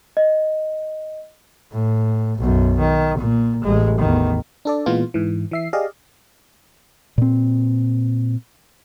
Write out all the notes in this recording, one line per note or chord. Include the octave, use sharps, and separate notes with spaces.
D#5
A2
B1 F#2
D#3
A#2
A1 G#3
E2 D#3
D4 A4 D5
A#2 E3 G#3 B3 F4
G#2 E3
E3 E5 C7
G4 G#4 D5 D#5 F5
A#2 C4